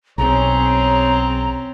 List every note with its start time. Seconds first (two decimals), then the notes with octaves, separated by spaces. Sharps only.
0.18 B1 C4 C#4 G#4 C#5 A#5